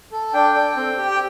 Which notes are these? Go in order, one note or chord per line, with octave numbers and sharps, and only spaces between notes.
A4
D4 G5
A4
C4
G4
G5